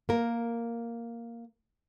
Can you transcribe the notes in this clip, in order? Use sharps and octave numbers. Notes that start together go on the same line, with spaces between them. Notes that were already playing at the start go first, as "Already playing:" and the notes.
A#3 A#4